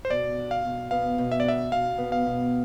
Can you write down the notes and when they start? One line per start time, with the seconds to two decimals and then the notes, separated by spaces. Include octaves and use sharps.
0.05 C5
0.10 B2 D5
0.38 D4
0.51 F5
0.65 B2
0.91 B3 F5
1.18 B2
1.32 E5
1.40 D5
1.44 D4 E5
1.72 B2 F5
1.98 B3
2.12 F5
2.26 B2